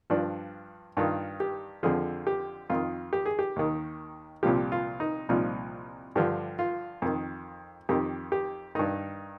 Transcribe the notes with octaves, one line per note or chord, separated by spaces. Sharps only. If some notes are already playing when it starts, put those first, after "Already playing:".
G2 F3 D4
G2 D#3 F4
G4
F2 D3 F3 G#4
G4
F2 D#3 F4
G4
G#4
G4
D#2 D#3
C2 A#2 F3 G4
F4
D#4
C2 A#2 F3 D#4
G2 D3 F3 G4
F4
F2 D#3
F2 D#3 G4
G4
G2 D#3 D#4